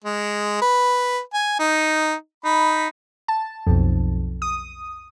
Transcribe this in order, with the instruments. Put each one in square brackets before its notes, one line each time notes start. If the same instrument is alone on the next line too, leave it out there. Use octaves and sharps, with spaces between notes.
[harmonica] G#3
B4
G#5
D#4
D#4 B5
[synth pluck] A5
B1 F2
D#6